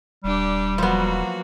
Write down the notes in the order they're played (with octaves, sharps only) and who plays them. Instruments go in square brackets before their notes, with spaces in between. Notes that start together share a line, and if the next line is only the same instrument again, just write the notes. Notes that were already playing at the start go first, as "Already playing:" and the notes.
[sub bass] D#1 [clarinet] G3 [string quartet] D4 G4
[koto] F3 B3 [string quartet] F#3 A#3 F#4